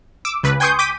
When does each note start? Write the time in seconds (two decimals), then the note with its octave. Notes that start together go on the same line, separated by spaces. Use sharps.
0.25 D6 E6
0.43 C#2 B4
0.60 G5 G#5 C6 C#6 D#6 G6
0.79 D6 G6 B6 D#7